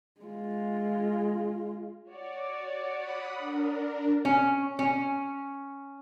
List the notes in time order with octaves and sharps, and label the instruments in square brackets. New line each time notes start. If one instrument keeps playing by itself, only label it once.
[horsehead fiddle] G#3 F4
[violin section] F#4 C#5 D5
[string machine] F#5 B5 D#6
D4 A#4
[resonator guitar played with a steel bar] C#4
C#4